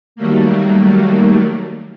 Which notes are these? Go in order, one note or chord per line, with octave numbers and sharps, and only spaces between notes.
D#3 F#3 G3 A3 A#3